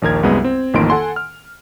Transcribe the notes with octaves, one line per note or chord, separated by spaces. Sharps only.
A#1 D#2 A#4 G#6
C2 F#2 G#3 B3
C4
A1 F2 D#3 A#3 C6 D7
A4 F#5 G#5 C6
F6